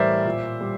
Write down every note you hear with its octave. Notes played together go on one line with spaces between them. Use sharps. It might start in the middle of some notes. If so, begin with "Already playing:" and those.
Already playing: A2 E3 G3 A#4 C5 D5 E5
A#2
G3